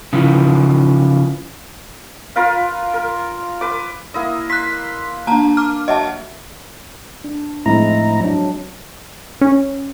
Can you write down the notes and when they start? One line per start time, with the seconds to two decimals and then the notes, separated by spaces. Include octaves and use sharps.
0.13 C#3 E3 F3
2.36 F4 A#4 B4 F5
2.94 A#4
3.61 B4 D6
4.14 A#3 E4 D#5
4.50 C6 F#6 B6
5.27 A#3 D4 A5 A#5
5.57 D6 F6
5.88 F#3 D#5 E5 A5
7.24 D4
7.66 A2 F3 G#3 C4 E4 A#5
8.21 F#3 D4
9.41 C#4